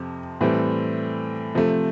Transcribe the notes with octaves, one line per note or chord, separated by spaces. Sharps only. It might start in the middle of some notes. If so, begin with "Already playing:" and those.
Already playing: F2 C3 F3
A2 E3 G3 C4
C3 F3 A3